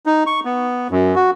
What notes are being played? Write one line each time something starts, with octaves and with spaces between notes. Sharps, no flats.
D#4
C#6
B3
F#2
F#4